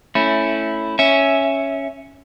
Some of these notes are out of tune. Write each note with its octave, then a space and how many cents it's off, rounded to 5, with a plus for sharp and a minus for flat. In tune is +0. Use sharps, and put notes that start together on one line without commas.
A3 +10 C#4 +0 E4 +0
C#4 +0 E5 +0